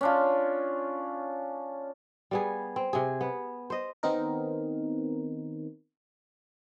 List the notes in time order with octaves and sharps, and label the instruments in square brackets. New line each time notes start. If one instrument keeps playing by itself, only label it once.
[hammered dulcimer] C#4 D4 F4
[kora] G3 B3 G#4
C4
C3 G#4
B3
C5 D#5
[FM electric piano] D#3 B3 C4 D#4 A#4